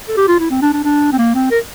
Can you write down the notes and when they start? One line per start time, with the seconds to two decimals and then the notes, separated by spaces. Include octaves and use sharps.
0.08 A4
0.17 G4
0.28 F4
0.40 E4
0.50 C4
0.62 D4
0.73 D4
0.84 D4
1.12 C4
1.18 A#3
1.35 C4
1.51 A#4